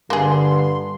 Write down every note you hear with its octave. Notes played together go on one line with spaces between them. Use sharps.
G2 D3 A#3 G#4 C6